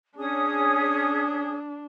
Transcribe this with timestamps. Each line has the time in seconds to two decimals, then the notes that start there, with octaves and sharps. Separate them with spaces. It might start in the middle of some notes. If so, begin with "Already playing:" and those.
0.17 C#4 D4 G#4 D#6